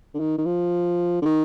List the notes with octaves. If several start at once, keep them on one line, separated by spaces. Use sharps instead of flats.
D3
D#3
D#3
F3
D3
D#3